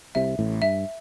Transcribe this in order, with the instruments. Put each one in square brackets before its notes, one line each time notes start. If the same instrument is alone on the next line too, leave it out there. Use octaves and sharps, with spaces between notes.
[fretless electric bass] C2 C3 [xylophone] E5
[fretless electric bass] A1 A2
[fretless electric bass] G2 [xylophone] E5